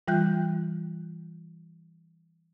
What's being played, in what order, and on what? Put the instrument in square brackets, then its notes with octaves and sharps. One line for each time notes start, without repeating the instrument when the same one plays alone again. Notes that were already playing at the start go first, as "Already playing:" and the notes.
[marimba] E3 G3 F4 F#6 G6